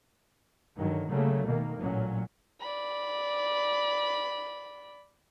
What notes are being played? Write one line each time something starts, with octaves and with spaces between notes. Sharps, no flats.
G2 D3 D#3 F#3
C#3 F#3 G3 A3 A#3
B2 D#3 A#3
A1 A#2 F#3 C#4
D5 B5